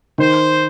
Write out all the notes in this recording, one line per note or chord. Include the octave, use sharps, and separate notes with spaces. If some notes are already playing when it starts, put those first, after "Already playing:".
D#3 C5